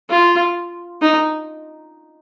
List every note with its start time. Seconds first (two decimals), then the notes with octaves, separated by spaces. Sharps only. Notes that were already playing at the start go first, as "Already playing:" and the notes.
0.10 F4
1.02 D#4